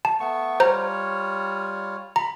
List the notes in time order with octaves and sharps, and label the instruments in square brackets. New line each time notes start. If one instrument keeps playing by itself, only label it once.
[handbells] A5
[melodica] A3 B3 C#6
[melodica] G3 F4 C#5 [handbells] C5 A#5
[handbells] A#5 [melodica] B5